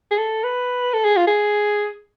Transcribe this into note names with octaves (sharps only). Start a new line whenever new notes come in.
G#4
A4
B4
A4
G#4
F4
G#4